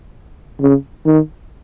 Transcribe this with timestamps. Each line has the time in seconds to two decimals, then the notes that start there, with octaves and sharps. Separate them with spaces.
0.61 C#3
1.06 D#3